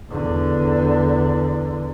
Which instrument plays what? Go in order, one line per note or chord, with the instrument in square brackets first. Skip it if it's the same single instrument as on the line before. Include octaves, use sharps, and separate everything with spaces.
[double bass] E2 D3